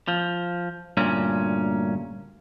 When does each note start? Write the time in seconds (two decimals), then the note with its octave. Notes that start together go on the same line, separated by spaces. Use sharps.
0.08 F3
0.97 D2 G2 A#2 C#4